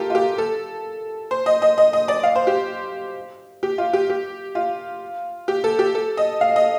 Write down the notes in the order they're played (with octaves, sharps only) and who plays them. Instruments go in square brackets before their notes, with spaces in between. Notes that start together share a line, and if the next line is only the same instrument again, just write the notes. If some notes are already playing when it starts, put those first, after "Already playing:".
Already playing: [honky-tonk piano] F4 G4 A4 A#4
F4
G4
A4
C5
D#5
D#5
D#5
D#5
D5
F5
C5
G4
G4
F4
G4
G4
F4
G4
A4
G4
A4
D#5
F5
D#5